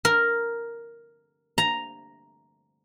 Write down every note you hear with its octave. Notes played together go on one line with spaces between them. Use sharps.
A#4
A#5